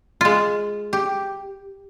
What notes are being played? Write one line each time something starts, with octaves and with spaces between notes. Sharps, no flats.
G#3 F4
G4